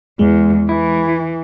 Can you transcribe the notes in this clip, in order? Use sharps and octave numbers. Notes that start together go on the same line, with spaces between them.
E2 G#3
E3 E4